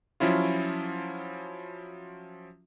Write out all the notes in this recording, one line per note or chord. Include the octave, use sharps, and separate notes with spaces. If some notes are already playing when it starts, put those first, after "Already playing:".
F3 F#3 C#4 E4 F4